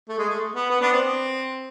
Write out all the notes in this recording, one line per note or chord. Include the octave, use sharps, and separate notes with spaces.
A3
G#3
A3
B3
B3
B3 D4
C4